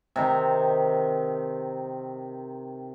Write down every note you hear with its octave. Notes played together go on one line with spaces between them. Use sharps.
C3 D#3 A#5